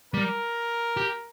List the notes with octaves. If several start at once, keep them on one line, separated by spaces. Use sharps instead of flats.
G3 A#4
G4